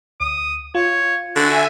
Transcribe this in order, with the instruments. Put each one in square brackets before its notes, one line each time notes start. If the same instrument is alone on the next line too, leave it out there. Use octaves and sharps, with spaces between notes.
[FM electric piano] D2 [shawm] D#6
[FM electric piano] F4 [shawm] C#5
[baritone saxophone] D3 [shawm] F#4 [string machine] E5 G#5